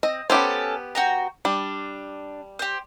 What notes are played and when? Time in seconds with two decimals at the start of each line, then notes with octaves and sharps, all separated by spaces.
0.03 C4 D#5
0.30 B3 C#4 G4 A4 C5
0.95 F#4 G5 A#5
1.45 G3 D4
2.59 G4 C5